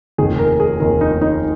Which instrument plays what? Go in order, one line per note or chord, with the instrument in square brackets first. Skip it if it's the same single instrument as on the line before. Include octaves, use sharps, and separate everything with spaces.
[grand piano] F1 D#2 D#3 G#4
A#4
G#4
F1 D#2 D#3 A#4
D#4
D#4